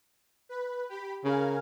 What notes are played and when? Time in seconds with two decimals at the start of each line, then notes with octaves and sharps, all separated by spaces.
0.49 B4
0.89 G4 B5
1.25 C#3 A#4 F5 G#5